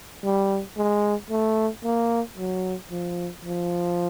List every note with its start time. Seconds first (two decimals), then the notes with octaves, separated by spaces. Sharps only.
0.23 G3
0.77 G#3
1.30 A3
1.84 A#3
2.37 F#3
2.91 F3
3.45 F3